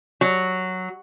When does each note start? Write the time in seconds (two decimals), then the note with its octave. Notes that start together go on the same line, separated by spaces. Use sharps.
0.21 F#3